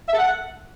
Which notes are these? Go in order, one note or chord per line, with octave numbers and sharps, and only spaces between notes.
E5
A4
F#5